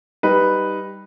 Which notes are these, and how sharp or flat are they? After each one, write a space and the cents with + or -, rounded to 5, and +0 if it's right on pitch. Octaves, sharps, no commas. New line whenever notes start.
G3 +0 D#4 +0 B4 +0